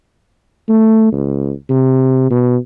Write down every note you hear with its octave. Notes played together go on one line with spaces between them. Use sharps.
A3
C#2
C3
B2